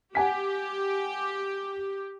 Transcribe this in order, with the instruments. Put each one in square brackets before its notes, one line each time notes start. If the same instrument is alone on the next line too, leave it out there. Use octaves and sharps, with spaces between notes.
[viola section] G4 [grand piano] F#5 G#5 B6